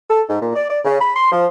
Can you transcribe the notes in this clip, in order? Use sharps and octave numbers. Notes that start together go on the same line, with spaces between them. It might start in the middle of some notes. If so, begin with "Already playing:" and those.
A4
G#2
A#2
D5
D5
C#3
B5
C6
F3